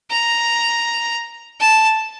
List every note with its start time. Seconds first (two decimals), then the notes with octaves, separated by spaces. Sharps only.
0.10 A#5
1.60 A5